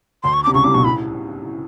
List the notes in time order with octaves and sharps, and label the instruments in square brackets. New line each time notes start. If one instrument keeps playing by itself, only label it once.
[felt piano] D2 D3 [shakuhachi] C6
[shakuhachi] C#6
D6
[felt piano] C3
[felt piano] C#2 C#3 [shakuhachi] C#6
[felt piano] C2 C3 [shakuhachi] D6
[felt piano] B1 B2 [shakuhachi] C#6
[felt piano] A2 [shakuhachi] B5